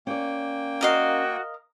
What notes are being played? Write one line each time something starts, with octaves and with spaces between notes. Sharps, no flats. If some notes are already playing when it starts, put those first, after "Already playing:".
A#3 C#4 D5 G5
F#4 A#4 D#5 F5